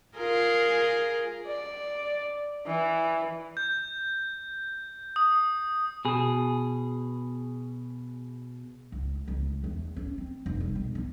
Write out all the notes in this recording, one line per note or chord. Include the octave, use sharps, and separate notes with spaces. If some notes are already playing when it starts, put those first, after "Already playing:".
F4 G#4 A#4
D5
E3
G6
D#6
B2 G#4
C#2
C#2
E2
C#4
C4
F1
G3
B1
D3